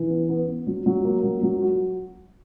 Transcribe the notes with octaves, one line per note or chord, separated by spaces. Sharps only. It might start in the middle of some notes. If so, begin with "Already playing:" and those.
Already playing: E3
B3
B3
B3
F#3
F#3
A#3
F#3
F#3
F#4